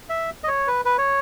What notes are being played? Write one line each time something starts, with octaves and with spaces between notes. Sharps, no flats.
E5
D#5
C#5
B4
B4
C#5